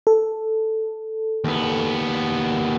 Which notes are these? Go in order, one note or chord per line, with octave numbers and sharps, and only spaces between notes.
A4
D#2 B3